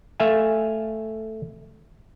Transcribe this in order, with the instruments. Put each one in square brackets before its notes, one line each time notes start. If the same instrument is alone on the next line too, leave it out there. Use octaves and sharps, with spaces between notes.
[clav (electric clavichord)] A3 E5 F5 G#5